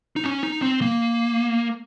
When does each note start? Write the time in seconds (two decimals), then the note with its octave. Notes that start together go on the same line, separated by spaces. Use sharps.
0.16 D#4
0.25 C#4
0.43 D#4
0.62 C4
0.82 A#3